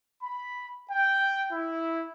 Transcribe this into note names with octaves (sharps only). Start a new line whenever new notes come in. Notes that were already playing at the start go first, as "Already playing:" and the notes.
B5
G5
E4